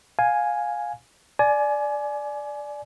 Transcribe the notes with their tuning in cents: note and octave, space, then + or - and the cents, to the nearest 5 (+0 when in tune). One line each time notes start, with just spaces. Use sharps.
F5 +15 G#5 +0
D5 +0 G#5 +25